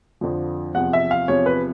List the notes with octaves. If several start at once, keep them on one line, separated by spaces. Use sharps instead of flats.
F2 D3 F3
E2 C3 F3 F#5
E5
F5
E2 C3 F3 C#5
B4